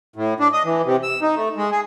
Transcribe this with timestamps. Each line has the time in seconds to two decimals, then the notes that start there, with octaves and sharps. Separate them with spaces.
0.16 A2
0.40 D4
0.53 D#5
0.65 E3
0.85 C3
1.03 E6
1.22 D#4
1.36 A3
1.56 G#3
1.72 G#4